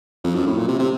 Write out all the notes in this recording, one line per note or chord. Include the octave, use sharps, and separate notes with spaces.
F2
F#2
A2
A#2
C3
C3